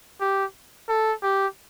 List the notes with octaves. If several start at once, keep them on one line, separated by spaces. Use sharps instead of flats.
G4
A4
G4